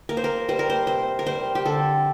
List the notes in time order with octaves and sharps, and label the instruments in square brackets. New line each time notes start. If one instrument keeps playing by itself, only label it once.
[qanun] A#3 A#4
C5
A#4
G3 C5
A#4
C5
C3 C5
A#4
G3 C5
G4
D3 A4